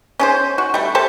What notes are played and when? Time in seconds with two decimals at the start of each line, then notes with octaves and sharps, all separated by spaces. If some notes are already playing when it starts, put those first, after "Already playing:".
0.19 C#4 G#4 C5
0.58 F#4
0.74 G3 A3
0.95 G4 A4 C5 A5